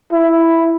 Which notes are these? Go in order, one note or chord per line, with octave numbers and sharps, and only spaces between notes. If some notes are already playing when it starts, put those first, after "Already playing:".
E4